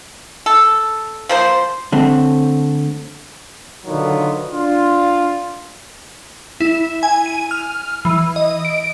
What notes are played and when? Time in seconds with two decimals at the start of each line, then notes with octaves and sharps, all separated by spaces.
0.46 A4
1.29 F3 A#3 C5
1.92 D3 A3 C4
3.86 B2 D3 D#3 F#3 B3 F4
4.51 D4 F4
6.60 E4
7.03 G#5
7.26 D#7
7.51 F6
8.05 E3
8.36 D#5
8.65 D7